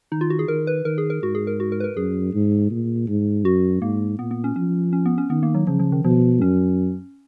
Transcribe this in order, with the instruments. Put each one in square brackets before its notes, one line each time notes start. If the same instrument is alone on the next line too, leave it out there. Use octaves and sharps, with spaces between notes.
[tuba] D#3 [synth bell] D#4
[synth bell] F4
F#4
G#4
[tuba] D#3 [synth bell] A#4
[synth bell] B4
[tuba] D#3 [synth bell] A#4
[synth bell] G#4
A#4
[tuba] G#2 [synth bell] F#4
[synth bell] G#4
A#4
F#4
A#4
B4
A#4
[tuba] F#2 [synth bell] G#4
[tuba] G#2
A#2
G#2
[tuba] F#2 [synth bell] F#4
[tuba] G#2 [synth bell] A#3
[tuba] A#2 [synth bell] B3
[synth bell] B3
C#4
[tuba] F3 [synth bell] C#4
[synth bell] C#4
B3
C#4
[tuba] D#3 [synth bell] B3
[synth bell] A#3
F#3
[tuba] C#3 [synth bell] F3
[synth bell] F3
D#3
[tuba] B2 [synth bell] F3
[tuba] F#2 [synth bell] C#4